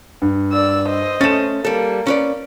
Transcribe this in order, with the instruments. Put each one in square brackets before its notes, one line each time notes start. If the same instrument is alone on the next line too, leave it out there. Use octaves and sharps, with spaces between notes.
[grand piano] G2
[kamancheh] D5 E6
C5 D#5
[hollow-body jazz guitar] A3 C#4 [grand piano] A6 E7
[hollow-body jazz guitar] G3 A4 [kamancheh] A#3
[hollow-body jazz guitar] C#4 B4 D5